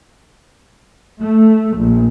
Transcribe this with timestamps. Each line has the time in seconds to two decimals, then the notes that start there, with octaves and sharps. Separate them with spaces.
1.18 A3
1.76 A#1